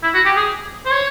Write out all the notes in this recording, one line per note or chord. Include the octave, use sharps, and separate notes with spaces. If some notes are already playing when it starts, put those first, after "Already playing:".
E4
F#4
G4
G#4
C5
C#5